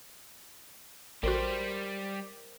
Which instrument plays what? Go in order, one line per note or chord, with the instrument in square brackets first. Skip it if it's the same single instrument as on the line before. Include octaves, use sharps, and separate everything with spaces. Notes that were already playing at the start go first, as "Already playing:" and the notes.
[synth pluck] A1 F#4 [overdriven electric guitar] G3 G4 [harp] A#4 C5